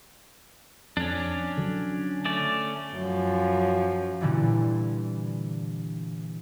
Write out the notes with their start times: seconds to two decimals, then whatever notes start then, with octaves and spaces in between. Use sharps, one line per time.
0.97 F2 C#4 D4
1.58 D3 F#3
2.25 A3 C#4 D5
2.95 F#2 F3
4.21 A#2 D3 E3 G3